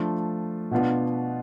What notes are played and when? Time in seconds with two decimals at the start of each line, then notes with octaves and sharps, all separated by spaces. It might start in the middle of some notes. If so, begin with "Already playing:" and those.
Already playing: F3 A3 D4 F4
0.71 B2 B3 D4 F4